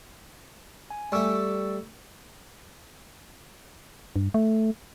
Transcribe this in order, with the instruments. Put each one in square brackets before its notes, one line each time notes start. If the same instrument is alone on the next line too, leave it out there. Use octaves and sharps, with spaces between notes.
[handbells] G#5
[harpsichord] G3 A3 [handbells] D5 C#6 E6
[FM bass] G2
A3